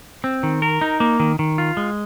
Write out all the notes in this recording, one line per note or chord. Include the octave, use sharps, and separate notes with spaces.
C4
D#3
A#4
D#4
A#3
D#3
D#3
F4
G#3